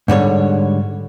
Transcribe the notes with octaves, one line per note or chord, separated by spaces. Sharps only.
G#2 D3 G3 C#5